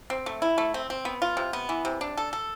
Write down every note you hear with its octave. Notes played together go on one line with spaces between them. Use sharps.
C4
A3
E4
A3
C4
C4
B3
F4
C3
B3
E3
C3
D4
A4
A4